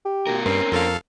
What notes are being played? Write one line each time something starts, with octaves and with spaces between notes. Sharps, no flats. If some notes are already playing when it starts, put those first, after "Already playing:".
G4
B2 A#4
G2 C4 C#4 A#4
F2 A4 F5